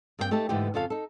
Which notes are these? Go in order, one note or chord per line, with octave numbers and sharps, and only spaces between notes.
G2 A#3 C4 F#4 G5
A3 D#4 G4 A4
G#2 D3 E3 A3 B3 G4
F2 C#3 F4 A4 F5
D#4 A4